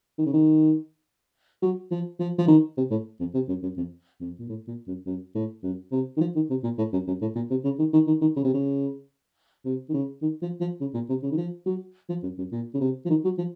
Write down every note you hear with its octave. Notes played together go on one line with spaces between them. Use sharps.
D#3
C#3
D#3
F#3
F3
F3
F3
D#3
C3
A2
F2
C3
F#2
F#2
F2
F2
A#2
A2
A#2
F#2
F#2
A2
F#2
C3
D#3
F3
D#3
C3
A#2
A2
F#2
F#2
A2
A#2
C3
C#3
D#3
D#3
D#3
D#3
C#3
C3
C#3
C3
D#3
C#3
D#3
F3
F3
C#3
A#2
C3
C#3
D#3
F3
F#3
F3
F#2
F#2
A#2
C#3
C3
F3
D#3
F#3
F3